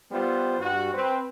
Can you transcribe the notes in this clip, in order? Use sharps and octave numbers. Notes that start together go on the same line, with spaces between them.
G3 B3 F4 C5
G2 G3 F#4
C4 B4